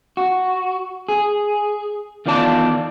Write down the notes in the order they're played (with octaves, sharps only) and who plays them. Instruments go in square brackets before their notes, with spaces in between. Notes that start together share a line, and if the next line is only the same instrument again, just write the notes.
[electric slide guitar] F#4
G#4
E2 D#3 F4 D5 A5